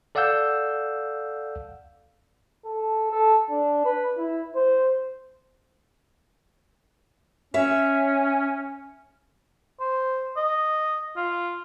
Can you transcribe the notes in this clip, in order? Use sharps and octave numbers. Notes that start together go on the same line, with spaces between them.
A4 D5 F5 F#5 E6 G6
A4
A4
D4
B4
E4
C5
C#4 C#5 E5
C5
D#5
F4